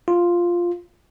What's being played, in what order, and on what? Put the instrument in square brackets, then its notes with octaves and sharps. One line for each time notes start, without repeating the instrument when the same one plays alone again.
[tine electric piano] F4